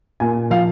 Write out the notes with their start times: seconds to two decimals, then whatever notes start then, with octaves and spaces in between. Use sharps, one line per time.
0.20 A#2 G#5
0.50 F3 F5